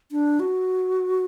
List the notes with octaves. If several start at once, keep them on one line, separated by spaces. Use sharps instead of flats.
D4
F#4